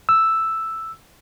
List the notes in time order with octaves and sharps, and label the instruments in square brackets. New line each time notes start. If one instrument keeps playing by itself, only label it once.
[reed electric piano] E6